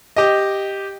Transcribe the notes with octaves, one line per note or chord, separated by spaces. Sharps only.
G4 D#5